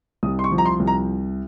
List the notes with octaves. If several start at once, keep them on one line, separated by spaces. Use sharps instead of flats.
C2 D#6
C6
C#6
F3
A#5
C6
C2
A#5